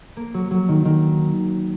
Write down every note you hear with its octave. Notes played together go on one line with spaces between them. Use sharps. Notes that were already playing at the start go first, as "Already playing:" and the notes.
A#3
F#3
F#3
D#3
D#3